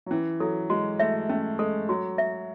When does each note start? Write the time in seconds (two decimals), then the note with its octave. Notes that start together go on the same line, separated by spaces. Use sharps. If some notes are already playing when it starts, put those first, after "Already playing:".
0.06 F#3
0.11 E3 C#4
0.40 F#3 A4
0.70 G#3 F#4
1.00 A3 E5
1.29 A3 C#4
1.59 G#3 A4
1.89 F#3 F#4
2.18 E5